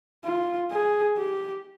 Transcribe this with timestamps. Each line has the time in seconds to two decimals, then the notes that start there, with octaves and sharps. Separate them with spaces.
0.25 F4
0.71 G#4
1.18 G4